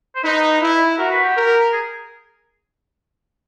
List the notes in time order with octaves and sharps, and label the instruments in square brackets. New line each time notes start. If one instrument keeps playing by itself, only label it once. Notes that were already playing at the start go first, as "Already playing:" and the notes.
[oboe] C5
[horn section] D#4 [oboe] B4
[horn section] E4
[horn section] F#4 [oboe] A#4
[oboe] B4
G4
[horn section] A#4
[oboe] G#4